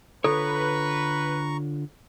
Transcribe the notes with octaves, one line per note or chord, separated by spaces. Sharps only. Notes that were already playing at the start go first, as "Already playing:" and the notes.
D3 F4 A4 B4 C#5 A#5 C#6